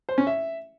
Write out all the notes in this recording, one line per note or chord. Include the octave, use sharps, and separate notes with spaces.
C5
C#4
E5